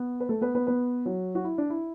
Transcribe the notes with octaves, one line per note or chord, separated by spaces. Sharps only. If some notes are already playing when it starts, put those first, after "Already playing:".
Already playing: B3
B4
A3 A4
B3 B4
B3 B4
B3 B4
F#3 F#4
F#4
E4
D4
E4